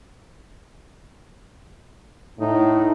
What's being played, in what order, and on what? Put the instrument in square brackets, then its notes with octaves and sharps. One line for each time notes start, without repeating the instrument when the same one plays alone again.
[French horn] A2 [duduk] D#4